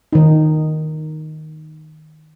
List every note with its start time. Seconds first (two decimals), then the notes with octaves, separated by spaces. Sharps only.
0.13 D#3 D#4